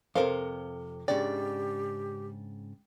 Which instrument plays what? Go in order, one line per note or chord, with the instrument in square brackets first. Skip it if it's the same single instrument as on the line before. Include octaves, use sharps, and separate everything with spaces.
[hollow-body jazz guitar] F2 A2 C3 [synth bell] A4 [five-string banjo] A#4 C5 F5
[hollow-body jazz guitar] G#2 C#3 D4 [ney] G4 [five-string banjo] D5 [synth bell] G5 A6